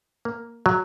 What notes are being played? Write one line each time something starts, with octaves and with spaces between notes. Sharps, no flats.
A#3
F#3